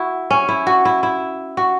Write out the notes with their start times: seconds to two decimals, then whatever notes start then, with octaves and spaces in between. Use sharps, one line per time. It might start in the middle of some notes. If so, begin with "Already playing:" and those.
Already playing: E4 F#4
0.30 C#4
0.49 E4
0.67 F#4
0.85 E4
1.03 E4
1.57 F#4